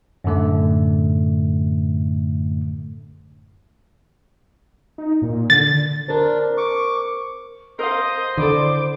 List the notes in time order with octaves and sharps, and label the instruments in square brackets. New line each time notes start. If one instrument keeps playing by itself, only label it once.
[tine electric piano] F#2 A2 D3 A3
[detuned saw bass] D#4
A#2
[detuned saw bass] D3 [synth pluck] A6
[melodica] D4 [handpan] A#4 C5
[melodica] C#6 D6
[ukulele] A#4 F5 [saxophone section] C5 [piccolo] D#5
[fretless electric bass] D3 [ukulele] E4 A4 [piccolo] D6